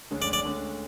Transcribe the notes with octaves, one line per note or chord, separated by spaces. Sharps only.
D2 D3 G#3 C#4
D5
D5
D2 D3 G#3 C#4